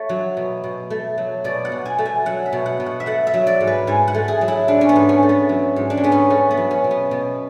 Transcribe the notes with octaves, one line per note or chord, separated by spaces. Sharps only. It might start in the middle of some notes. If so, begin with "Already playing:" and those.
Already playing: A3 C#5
F#3
B2
B2
A3
F#3
B2 D5
F#5
B2
G#5
A3
G#5
F#3 F#5
E5
B2
F#5
B2
F#5
E5
A3 F#5
E5
F#3
D5
G#2
B4
G#2 G#5
F#5
A3
G#4
F#3
E4
G#2 D4
C#4
B3
G#2
C#4
A3
B3
F#3
G#2
D4
C#4
G#2 B3
C#4
A3 C#4
B3
F#3
C#4
B2
B3
B2